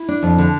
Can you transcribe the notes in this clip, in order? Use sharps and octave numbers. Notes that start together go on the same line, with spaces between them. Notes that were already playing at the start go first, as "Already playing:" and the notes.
Already playing: E4
D4
F2
D3